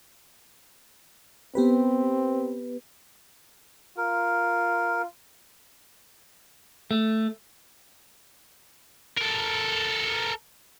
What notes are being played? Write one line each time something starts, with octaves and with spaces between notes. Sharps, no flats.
B3 C4 G4 B4
F4 A#4
A3
A4 A#4